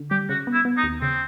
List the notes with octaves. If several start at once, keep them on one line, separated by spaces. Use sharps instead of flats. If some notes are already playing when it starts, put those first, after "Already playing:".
Already playing: D3
G3 G4
C#3 F#4
B3
E4
B3
D#4
D#2
C#3 C4